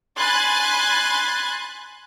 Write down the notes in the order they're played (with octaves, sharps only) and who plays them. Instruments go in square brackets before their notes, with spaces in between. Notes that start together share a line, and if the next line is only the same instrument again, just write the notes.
[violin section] G#5 B5 C6 F#6 G#6 A6